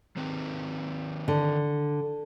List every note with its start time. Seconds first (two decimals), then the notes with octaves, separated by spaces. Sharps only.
0.16 D#3 C4 B4
1.28 D3